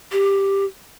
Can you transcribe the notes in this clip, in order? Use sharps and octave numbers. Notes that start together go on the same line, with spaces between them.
G4